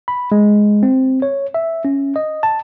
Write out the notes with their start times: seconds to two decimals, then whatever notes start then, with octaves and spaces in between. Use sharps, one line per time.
0.08 B5
0.32 G#3
0.83 C4
1.22 C#5
1.54 E5
1.85 C#4
2.16 D#5
2.43 A5